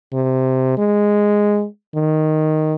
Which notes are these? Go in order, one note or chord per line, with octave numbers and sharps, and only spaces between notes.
C3
G#3
D#3